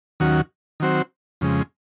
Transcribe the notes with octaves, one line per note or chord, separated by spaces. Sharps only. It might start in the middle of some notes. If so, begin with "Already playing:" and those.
D#2 D#3 F#3 C#4 F#4
D#3 F#3 C4 F#4 C5
F2 C#3 G#3